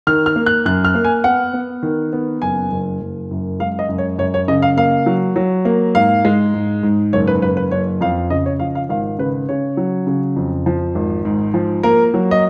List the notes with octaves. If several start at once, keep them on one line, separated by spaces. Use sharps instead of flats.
D#3 F6
F6
A#3
F#6
F#2 F#6
F6
A#3
G#5
B3 F#5
B3
D#3
B3
F#1 G#5
F#1
F#1
F#2
G#3 F5
D#5
F#2
C#5
F#2 C#5
C#5
C#3 D#5
F5
A#3 F5
F#3
F#3
A#3
G#2 F5
G#3
G#2
G#2
F#1 C#5
B4
F#1 B4
B4
F#1 C#5
F2 F5
C#3 D#5
C#5
F3 F5
F5
G#1 F5
C#3 B4
C#3 C#5
F#3
C#3
F2
F3
G#1
G#2
F3
A#3 A#4
F#3
D#5